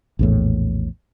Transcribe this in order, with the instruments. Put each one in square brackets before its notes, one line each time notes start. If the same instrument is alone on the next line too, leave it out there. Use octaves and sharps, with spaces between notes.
[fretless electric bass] A#1 E2 A2